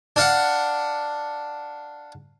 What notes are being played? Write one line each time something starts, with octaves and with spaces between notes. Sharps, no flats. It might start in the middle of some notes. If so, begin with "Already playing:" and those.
D4 F5 F#5